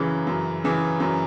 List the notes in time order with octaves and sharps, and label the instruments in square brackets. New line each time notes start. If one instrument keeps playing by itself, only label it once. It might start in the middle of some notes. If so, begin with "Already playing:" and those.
Already playing: [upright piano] F#2 C#3 E3
F#2
C#3 E3
F#2